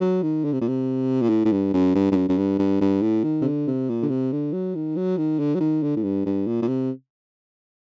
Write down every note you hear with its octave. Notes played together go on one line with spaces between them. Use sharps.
F#3
D#3
D3
C3
A#2
C3
A#2
A2
A2
G2
F#2
G2
G2
F#2
F#2
G2
G2
G2
A2
D#3
C3
D3
C3
A#2
D3
C3
D3
F#3
D#3
F#3
D#3
D3
F#3
D#3
D3
A2
G2
G2
A#2
A#2
C3